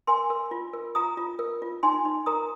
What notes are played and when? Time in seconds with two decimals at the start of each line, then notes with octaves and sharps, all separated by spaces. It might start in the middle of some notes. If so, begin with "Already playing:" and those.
0.07 A#4 G#5 C6
0.30 A#4
0.51 F4
0.73 A#4
0.95 F4 A#5 D#6
1.17 F4
1.39 A#4
1.62 F4
1.83 D#4 G#5 C6
2.05 D#4
2.26 A#4 A#5 D#6